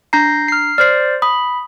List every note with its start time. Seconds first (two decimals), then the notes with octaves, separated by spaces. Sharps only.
0.13 D4 A#5 G6 A#6 C7
0.48 F6 C7
0.78 C5 D5 F6 C7
1.22 B5 D#6